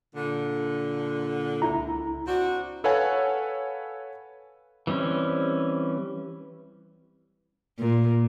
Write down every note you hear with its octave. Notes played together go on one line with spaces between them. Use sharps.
A#2 D3
C#2 E4 A#5
C4 D4 F#4
A4 B4 C#5 F5 F#5 G#5
E3 G3 C4 C#4
A#2